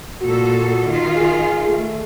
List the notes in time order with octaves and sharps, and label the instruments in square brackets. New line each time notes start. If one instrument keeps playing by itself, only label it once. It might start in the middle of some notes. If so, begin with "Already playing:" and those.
[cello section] A#2 A4 [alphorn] F#4
[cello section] D#3 F4
[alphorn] G#4
A3